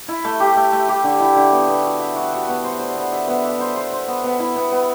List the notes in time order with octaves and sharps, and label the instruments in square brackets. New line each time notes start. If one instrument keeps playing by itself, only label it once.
[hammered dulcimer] E4
A3
G4
A3
A3
G4
D3
E4
D3
B3
B3
F#4
E5
F#4
F#4
B3
C5
C5
B3
E5
B3
E5
C5
C5
C5
B3
B3
E4
B3
B3